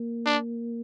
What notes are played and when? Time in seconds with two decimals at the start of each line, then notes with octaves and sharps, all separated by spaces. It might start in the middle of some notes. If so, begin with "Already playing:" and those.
Already playing: A#3
0.26 D4